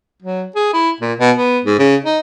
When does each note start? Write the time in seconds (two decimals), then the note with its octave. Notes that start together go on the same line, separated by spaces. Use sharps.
0.22 F#3
0.55 G#4
0.74 E4
1.01 A#2
1.20 B2
1.37 B3
1.65 G#2
1.79 C#3
2.04 D#4